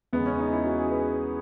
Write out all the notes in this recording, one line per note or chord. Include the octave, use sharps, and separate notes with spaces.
E2 C#3 G#3 B3
C#4
D#4
E4
F#4
G#4
B4